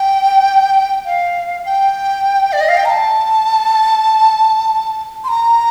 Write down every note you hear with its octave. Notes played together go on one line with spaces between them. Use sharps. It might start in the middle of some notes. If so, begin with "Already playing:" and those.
Already playing: G5
F5
G5
D5
D#5
F5
G5
A#5
A5
C6
A#5